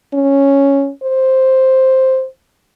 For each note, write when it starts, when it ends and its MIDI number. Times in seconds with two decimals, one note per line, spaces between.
0.14 0.90 61
1.03 2.26 72